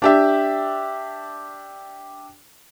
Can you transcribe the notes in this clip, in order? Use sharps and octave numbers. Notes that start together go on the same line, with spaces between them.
D4 G4 E5